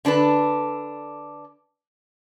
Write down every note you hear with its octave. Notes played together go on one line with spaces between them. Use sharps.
D3 D4 A4 B4